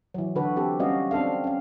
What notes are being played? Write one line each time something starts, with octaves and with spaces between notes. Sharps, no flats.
E3 F#3
D3 F#4 A4 B4
C4 G4 A4
G3 B3 C#4 F#4 D#5 F5
C4 D4 A4 F5
C#4 F5